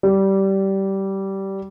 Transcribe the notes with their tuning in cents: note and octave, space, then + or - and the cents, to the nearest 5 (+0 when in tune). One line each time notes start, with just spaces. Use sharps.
G3 -15